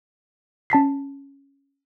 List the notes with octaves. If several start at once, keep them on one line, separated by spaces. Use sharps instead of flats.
C#4 A5 B6 C7